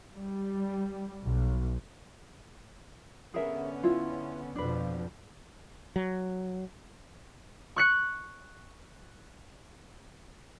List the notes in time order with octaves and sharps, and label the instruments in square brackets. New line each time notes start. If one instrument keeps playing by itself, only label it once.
[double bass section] G3
B1
[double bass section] D3 B3 C#4 [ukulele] G#4 A#4 E5
[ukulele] E4 F4
[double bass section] F2 B2 F3 [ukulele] D4 B4
[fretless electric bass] F#3
[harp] C#6 F#6 C#7